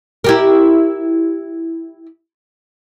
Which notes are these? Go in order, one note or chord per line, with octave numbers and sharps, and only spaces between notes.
E4 G4 A#4